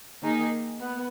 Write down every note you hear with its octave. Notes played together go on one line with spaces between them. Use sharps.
D#3 A#3 D#4 G#4
B3